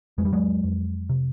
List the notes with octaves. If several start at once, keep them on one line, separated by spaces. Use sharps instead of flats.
F2 G#3
G3
F#3 G#3
F2
C3